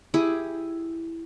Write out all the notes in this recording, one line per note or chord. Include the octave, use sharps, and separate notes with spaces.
E4 G4 G#4